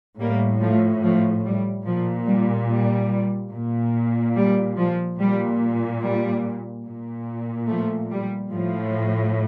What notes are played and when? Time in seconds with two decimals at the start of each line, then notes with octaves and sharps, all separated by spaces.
0.19 A2 G3 A#3
0.61 F3 A3
1.03 F3 A3
1.45 G3
1.86 A#2 F3
2.27 G3
2.70 G3
3.53 A#2
4.36 G3
4.78 F3
5.19 A#2 G3
6.02 G3
6.86 A#2
7.68 F3 A3
8.11 G3
8.52 A2 F3